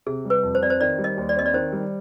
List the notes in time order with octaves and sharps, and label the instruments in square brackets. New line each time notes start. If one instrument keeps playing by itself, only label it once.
[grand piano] C3 [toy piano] G#4
[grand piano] G3
[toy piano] B4
[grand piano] F2
[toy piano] C5
[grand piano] C4 [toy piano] D5
[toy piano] C5
[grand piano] D#3 [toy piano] D5
[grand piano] G3
[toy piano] D#5
[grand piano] D#2
[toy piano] D5
[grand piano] C4 [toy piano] D#5
[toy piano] D5
[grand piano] D#3 [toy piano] C5
[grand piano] G3